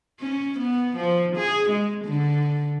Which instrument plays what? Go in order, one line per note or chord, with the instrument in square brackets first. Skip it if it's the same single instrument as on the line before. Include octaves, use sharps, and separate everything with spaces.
[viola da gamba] C#4
B3
F3
G#4
G#3
D3